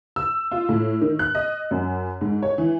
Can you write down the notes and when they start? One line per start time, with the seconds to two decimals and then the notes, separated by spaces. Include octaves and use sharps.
0.16 E6
0.51 F4
0.69 A2
1.01 D#3
1.19 F#6
1.35 D#5
1.71 F#2
2.21 G#2
2.42 C#5
2.58 E3